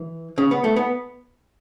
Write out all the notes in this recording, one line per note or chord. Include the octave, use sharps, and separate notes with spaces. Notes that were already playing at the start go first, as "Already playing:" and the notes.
Already playing: E3
C#3
B3
A3
B3